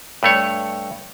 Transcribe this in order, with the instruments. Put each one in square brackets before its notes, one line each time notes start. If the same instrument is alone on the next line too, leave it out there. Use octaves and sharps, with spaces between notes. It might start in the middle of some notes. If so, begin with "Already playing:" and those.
[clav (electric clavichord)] G2 A3 C#5